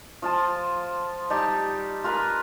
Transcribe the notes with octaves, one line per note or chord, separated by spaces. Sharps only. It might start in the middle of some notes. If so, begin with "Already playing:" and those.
F3 F4 A5
G3 D#4 G4 A5
F4 A#4 B4 B5